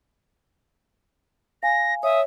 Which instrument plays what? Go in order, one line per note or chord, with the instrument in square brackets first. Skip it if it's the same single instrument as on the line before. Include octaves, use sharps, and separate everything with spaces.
[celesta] F5 G#5 [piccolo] A#6
[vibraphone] C#5 [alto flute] E5 [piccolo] D#6